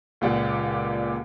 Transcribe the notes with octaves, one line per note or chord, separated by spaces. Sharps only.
C#2 A#2 A#3 G4 D5 F#5